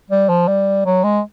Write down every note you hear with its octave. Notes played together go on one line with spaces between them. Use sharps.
G3
F3
G3
F#3
G#3